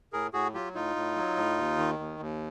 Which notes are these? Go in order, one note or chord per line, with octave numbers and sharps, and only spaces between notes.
A2 G#4 A#4
A2 F#4 G#4
F#3 F4 G4
A2 D#4 F4
A2
F#3
A2
D#2
D#3
D#2
D#2